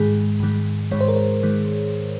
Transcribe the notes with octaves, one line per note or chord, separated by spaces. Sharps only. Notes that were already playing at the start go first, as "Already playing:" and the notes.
Already playing: G#2 D#3 G#3 G#4
G#2 D#3 G#3
G#2 D#3 G#3 C#5
C5
A#4
C5
D#3 G#3